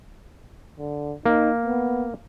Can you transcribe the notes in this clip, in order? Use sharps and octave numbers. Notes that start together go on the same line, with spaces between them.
D3
A#3 D#4
B3